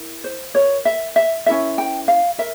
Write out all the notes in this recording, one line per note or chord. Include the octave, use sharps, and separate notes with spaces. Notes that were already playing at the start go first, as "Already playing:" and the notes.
Already playing: E4 A#4
C5
F4 A#4 C#5
E5
E5
C#4 E4 A#4 E5
G5
F5
A#4 E5